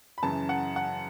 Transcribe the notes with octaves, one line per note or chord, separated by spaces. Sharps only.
B5
F#2 C#3 E3 A5
F#5
F#5